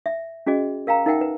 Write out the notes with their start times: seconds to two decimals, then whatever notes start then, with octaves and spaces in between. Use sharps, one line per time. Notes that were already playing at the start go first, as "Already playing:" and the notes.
0.06 E5
0.47 C#4 F#4 G#4 D#5
0.87 A#4 F5 G5 A#5
1.06 D#4 A#4 E5 F#5 G5
1.21 B4